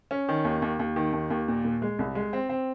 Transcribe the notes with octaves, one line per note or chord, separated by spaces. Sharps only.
C#4
D#3
D#2
D#2
D#2
D#3
D#2
D#2
A#2
A#2
G#3
C2
G#3
C4
C4